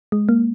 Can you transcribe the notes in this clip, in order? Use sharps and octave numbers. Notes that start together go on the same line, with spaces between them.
G#3
A#3